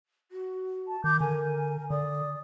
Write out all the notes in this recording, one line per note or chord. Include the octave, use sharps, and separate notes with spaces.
F#4
A5
D#3 D6 G6
D3 A#4 G#5
D3 D5 D#6